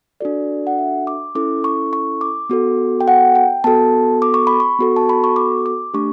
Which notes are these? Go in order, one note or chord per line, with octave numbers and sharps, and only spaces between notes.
D4 F#4 A4 D5
F#5
E5
D6
C#4 E4 A4 D6
C#6
C#6
D6
B3 F#4 A4
G5
F#5
G5
B3 F#4 A4 A5
D6
C#6
B5
C#6
B3 F#4 A4
A5
B5
C#6
D6
D6
A3 D4 G4 C#6